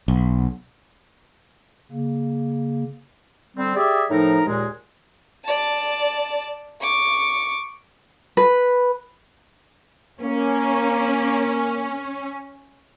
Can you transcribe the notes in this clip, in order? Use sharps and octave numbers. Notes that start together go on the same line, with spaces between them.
B1
C#3 A#3
D3 G3 C4
G4 G#4 D5 E5
A2 F3 D#4 A#4
D#2 A#2 G#3
D5 A5
C#6 D6
B4
A#3 C#4